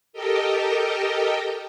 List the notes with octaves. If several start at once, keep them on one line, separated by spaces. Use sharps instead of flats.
G4 A4 A#4 D#5 G5